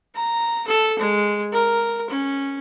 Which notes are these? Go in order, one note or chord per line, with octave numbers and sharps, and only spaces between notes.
A#5
A4
G#3
A#4
C#4